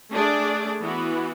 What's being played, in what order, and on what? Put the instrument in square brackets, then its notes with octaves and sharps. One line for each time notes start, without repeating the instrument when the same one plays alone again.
[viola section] A3 D4 G#4 D5
E3 B3 F#4